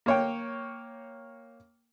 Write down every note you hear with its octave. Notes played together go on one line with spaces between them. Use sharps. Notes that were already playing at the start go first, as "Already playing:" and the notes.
A#3 C#5 G5